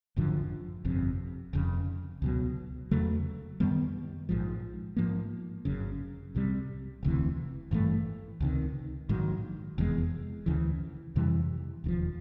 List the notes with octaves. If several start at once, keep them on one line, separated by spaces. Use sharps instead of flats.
G#1 F#2 D3 F3
G1 F2 C3
F1 F2 C#3
C#2 B2 F#3
E2 C#3 F#3 A3
F#2 D#3 G3 B3
A#1 G#2 F3
G#2 F3 A#3
G1 F#2 C#3
C2 C3 E3 G3
E1 D2 C3 E3
G#1 G2 E3 A3
C#2 C3 D#3
A#1 G#2 D#3 F#3
F1 E2 B2 G#3
D2 C#3 E3
F2 C3 E3 G3
E1 D#2 C#3 F3